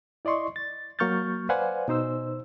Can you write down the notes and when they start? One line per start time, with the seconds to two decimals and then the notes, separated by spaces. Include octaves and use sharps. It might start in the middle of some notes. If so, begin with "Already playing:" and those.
0.25 E4 D5 D#5 C6 C#6
0.56 A6
0.99 F#3 A#3 C#6 F6 G6 A6
1.49 B4 C5 D5 F5 F#5 G#5
1.88 B2 D#4 C5 E6